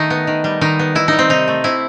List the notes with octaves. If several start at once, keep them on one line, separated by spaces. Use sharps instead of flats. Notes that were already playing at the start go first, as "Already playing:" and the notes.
Already playing: D#3 A3 D#4
B3
D#3
G3
D#3 D#4
B3
D#3 E4
G3 D#4
C4
C3 D#4
A3
C3 E4